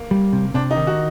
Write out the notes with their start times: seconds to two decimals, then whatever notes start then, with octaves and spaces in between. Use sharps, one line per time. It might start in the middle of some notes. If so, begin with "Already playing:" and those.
Already playing: A#3
0.11 G3
0.33 C3
0.54 C3 D4
0.71 D#4
0.77 D#3
0.87 F#4